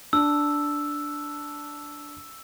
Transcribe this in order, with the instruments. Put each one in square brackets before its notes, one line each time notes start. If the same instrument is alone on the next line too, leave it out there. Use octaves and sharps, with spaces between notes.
[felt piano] D4 [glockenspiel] E6